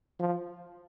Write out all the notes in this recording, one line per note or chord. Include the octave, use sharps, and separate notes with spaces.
F3